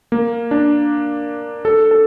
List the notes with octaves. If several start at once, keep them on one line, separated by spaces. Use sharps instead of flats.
A#3
D4
A4
A4